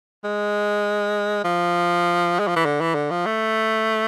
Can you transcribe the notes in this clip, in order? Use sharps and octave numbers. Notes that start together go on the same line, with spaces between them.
G#3
F3
G#3
F3
E3
D3
E3
D3
F3
A3